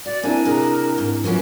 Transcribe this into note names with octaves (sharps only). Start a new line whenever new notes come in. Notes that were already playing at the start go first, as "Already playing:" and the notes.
F#4 D5
A#3 C4 D4 E4 G#5
C3 F#4 G#4 A#4
G#2
F2 E3 F#3 A#3 C#4 F4 F#4